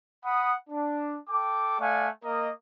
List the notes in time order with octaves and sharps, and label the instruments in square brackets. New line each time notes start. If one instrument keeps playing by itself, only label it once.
[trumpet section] F#5 B5 D#6
D4
A4 G5 D6
A3 D5 F5 F#5 G#5
A#3 A#4 D#5